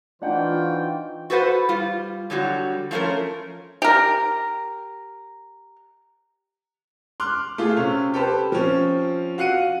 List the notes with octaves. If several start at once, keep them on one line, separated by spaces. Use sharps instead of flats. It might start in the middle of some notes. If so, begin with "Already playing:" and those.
E3 D4 D#4 F4 F#4 C5 F#5 G5
F#4 A4 B4 C5 F#5
G3 F4
D3 F#3 G3 F#4
F3 A3 C#4 D4 A#4
G4 A#4
C6 D6 F6 F#6
A3 F4 G#4
C3 C#4
G4 A4 B4 C5
F3 C4 C#4
F#4 F5 F#6 C#7 D#7